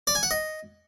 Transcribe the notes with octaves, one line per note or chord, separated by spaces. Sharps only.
D5
G#5
F#5
D#5